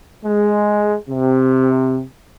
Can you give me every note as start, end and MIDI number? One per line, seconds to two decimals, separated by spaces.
0.24 0.96 56
1.09 2.01 48